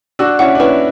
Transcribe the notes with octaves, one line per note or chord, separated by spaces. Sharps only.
D4 F#4 E6
C#4 E4 F#5
D4
C#4 E4 B4